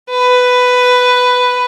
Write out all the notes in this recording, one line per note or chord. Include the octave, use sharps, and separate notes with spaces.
B4